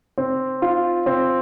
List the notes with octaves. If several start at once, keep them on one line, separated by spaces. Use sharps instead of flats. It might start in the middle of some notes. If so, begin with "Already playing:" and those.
C4
F4
C4